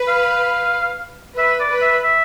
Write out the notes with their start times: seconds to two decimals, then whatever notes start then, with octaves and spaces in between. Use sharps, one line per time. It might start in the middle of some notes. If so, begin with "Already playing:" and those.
Already playing: B4
0.08 F5
1.38 B4 E5
1.60 D5
1.72 B4
1.82 E5
2.04 E5